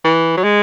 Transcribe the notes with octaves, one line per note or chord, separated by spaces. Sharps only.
E3
F#3
G#3